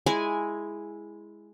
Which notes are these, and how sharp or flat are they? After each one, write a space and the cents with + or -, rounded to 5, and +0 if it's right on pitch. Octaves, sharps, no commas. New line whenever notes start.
G#3 +0 E4 +0 G#5 -5